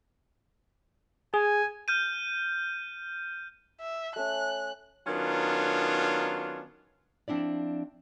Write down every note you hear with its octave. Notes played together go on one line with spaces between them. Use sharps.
G#4 G#5
F6 G6 D#7
E5
A3 C#4 F#6
D#3 F#3 B3 C#4 D4 F4
F3 C4 D4 E4 D5